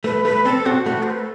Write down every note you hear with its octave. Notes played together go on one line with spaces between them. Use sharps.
A3 B4
A3 B4
C4 A4
C4 F#4
A3 F#4
C5
B4
A4